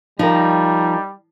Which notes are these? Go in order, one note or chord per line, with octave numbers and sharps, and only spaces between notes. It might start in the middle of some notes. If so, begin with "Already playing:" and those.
F3 G3 D#4 A#4